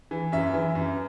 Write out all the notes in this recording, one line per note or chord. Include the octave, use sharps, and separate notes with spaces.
E3
F#2 E5
E3
F#2